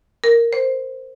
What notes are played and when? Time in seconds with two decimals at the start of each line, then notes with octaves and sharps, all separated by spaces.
0.24 A#4
0.53 C5